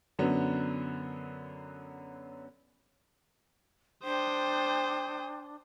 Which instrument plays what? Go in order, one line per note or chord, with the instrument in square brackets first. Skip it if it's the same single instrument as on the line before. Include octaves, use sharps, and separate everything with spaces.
[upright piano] F#2 D3 F#3 B3
[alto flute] D4 [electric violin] C5 D#6 [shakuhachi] G5